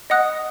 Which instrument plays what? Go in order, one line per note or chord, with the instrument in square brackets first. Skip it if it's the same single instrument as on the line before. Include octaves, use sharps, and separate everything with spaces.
[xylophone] D#5 F#5 D#6 F#6